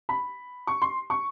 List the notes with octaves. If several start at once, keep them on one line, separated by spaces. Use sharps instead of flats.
B5
C#6
C6
C#6